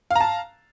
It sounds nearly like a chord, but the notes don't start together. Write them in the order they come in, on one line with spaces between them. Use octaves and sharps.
F5 A#5 A5